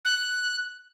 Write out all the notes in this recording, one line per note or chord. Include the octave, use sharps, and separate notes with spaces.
F#6